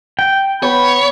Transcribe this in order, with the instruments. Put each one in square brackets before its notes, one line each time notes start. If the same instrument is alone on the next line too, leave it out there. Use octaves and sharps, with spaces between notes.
[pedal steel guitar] G5
[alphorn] B3 [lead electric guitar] C#5 [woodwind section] B5